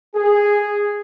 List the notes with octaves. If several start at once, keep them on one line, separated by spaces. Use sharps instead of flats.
G#4